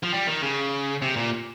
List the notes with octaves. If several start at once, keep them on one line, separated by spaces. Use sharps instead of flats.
F3
G3
D#3
C#3
C3
A#2